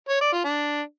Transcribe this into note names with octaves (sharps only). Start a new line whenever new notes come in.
C#5
D5
F4
D4